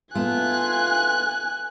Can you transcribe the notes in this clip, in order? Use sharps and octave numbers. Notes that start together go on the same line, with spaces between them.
A3 B3 F4 G#5 F#6